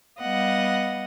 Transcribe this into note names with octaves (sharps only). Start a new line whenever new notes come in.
G3 B3 D#5 F5 F#5